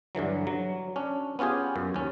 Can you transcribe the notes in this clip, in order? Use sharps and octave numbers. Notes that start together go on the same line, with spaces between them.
G2 D3 E3 F#3
F#3
C#4 D4
B3 C#4 F4 G4 G#4
F#2
D#2 C#4